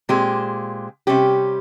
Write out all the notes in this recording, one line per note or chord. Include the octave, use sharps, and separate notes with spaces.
A#2 G#3 C4 G4
C3 G3 C#4 G4